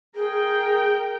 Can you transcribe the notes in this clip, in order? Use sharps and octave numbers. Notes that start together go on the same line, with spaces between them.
G#4 A#4 G5